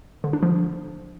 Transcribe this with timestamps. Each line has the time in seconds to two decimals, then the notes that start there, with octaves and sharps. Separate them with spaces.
0.24 D3
0.33 D4
0.43 F3